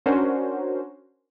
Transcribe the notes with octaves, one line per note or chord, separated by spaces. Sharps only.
C#4 D4 F#4 A#4 C5